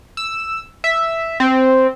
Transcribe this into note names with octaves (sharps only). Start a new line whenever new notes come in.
E6
E5
C4